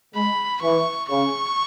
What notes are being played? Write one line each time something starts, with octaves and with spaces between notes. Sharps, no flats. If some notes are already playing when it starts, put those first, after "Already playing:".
G#3 B5
E3 C#6
C#3 C#6